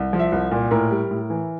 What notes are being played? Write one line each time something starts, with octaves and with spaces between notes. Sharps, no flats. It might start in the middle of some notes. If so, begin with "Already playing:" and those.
Already playing: C2
F3
E5
C2
A#2
A2 A#4
G3
A2
E3